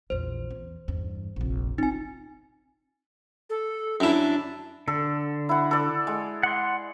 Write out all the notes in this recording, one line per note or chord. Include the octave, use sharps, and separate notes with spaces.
A#1 E2 C5
E2
E2 G2
F1 A#1
C4 D#4 F4 G#5
A4
F#2 D4 E4
D3 A4
E4 F#5
A4 D5
G#3
F#5 C6